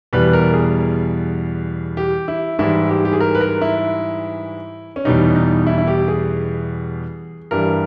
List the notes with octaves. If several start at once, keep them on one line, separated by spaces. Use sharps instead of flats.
E2 B2 G3 B4
A#4
G#4
G4
E4
G#2 E3 G3 E4
G4
G4
G#4
A#4
B4
A#4
E4
C#4
E2 B2 G3 D#4
D#4
E4
E4
G4
G#4
G2 E3 G3 A#4